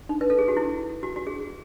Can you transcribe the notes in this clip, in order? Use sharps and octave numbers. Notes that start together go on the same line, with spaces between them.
D#4
B4
A4
G#4
F#4
E4
F#4
F#4
G#4